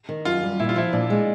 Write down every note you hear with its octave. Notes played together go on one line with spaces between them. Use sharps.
D#3
F#2 F4
G3
A#2 E4
F4
F3 E4
A#2 D4
G#3